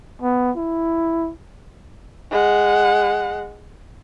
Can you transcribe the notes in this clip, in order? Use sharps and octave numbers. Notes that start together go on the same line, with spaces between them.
B3
E4
G#3 F#5